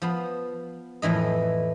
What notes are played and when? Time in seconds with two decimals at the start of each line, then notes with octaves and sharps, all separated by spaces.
0.02 F3 B3
1.02 F2 A2 E3 D#5